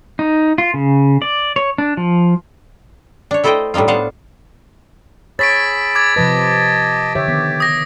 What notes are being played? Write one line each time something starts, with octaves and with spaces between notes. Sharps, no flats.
D#4
F4
C#3
D5
C#5
D4
F3
D4 C#5
A3 E4 A4 C5 D#5 G5
A2 G3 D4 D#4 F4
A2 B3 D4 C5 F5 F#5
G#4 C#5 B5 E6 A6 B6 D7
D6 G#6 A6
C3 F3 B4 D#5 A5
D3 G4 C#5 E5
D#3 B3
D#6 A#6